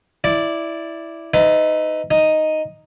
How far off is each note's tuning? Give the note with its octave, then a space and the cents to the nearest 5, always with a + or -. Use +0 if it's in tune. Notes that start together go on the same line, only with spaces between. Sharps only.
E4 +0 D5 +0
D#4 +0 B4 +40 E5 +0
D#4 +0 D#6 +0